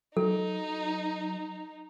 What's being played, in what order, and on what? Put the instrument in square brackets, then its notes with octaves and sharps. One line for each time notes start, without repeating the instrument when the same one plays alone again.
[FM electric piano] F#3 [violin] D#4 [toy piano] A4